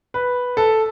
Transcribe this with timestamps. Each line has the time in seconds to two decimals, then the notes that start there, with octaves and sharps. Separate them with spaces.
0.14 B4
0.57 A4